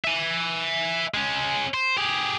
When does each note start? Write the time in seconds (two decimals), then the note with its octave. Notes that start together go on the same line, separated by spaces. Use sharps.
0.04 E5 G#5
1.14 G#3 C#4
1.74 C5
1.97 G4 G#4